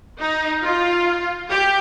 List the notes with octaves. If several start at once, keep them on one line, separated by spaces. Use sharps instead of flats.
D#4
F4
G4